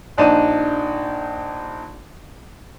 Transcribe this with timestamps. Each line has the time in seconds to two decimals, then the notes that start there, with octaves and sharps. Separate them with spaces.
0.18 A#1 D4 D#4 A5 D#7